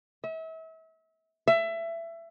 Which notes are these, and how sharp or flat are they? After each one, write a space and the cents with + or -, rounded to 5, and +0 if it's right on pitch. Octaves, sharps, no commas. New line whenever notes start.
E5 -35
E5 +20